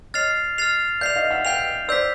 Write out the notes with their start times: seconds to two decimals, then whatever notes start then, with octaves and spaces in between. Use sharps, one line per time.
0.14 C#5 D#5 F6 A6 C7 F7
0.58 F6 A6 C7 F7
1.01 D5 E5 G6 C7 F7
1.16 D#5 F5
1.31 E5 F#5
1.45 F5 G5 G6 C7 F7
1.88 C5 D5 E6 G6 B6